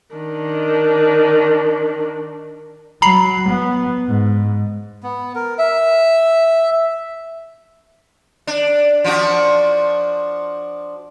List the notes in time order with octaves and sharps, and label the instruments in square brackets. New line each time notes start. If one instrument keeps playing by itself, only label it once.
[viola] D#3 D4
[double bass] F#3 [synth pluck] A#5 B5 C7
[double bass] B3
G#2
[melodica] B3
A#4
E5
[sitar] D4
F3 D4 F#4